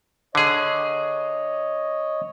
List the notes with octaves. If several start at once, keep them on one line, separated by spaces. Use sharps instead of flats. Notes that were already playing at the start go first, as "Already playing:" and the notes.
D3 G#4 C#5 D#5